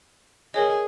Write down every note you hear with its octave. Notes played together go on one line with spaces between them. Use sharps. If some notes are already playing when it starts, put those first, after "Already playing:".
G#4 A#4 C#5 D#5